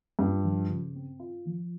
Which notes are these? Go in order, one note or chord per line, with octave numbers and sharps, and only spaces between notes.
G2 F4
F3
C#3
C4
F4
F3